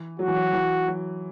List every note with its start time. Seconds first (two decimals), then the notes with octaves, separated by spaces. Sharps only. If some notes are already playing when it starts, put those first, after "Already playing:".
Already playing: E3
0.19 F#3 F#4
0.28 E3
0.36 F#3
0.53 E3
0.88 F#3